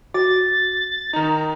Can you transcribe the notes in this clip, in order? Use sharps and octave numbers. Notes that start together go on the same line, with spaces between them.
F#4 A6
D#3 D#4 A#5